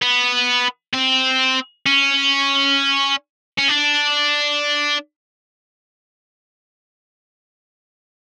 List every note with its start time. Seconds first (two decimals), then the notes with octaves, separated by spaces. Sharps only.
0.02 B3
0.93 C4
1.86 C#4
3.59 C#4
3.69 D4